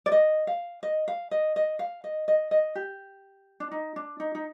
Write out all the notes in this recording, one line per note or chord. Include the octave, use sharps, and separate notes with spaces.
D5
D#5
F5
D#5
F5
D#5
D#5
F5
D#5
D#5
D#5
G4
D4
D#4
D4
D#4
D#4